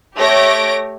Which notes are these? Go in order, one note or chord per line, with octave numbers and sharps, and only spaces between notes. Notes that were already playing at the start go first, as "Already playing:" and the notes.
A3 G4 C#5 A#6 D7